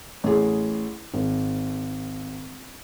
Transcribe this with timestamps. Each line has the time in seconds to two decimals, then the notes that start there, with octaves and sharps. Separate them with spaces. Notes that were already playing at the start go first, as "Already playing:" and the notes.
0.24 A1 G#4
1.13 G#1